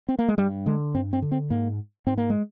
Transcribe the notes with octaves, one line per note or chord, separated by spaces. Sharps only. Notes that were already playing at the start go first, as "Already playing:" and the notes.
C4
A#3
G#3
G2 G3
D3 G#3
G2 C4
C4
D3
C4
G#2 A#3
G#2 C4
A#3
G#3